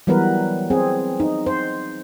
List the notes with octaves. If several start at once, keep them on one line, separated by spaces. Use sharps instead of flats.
E3 F#3 G3 B3 A#4 B4
C4 G#4
D#4
C5